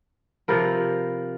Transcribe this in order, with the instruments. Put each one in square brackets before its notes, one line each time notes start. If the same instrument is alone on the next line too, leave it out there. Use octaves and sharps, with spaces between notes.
[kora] C3 F3 A#4 B4